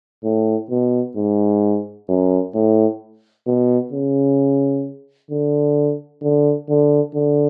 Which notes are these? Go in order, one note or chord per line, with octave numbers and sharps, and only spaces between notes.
A2
B2
G#2
F#2
A2
B2
C#3
D3
D3
D3
D3